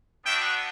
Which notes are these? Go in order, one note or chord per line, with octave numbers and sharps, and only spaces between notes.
B3 D4 F#4 E5 G5